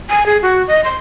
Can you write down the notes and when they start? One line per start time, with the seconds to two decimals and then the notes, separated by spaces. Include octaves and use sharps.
0.10 G#5
0.26 G#4
0.42 F#4
0.68 D#5
0.84 C6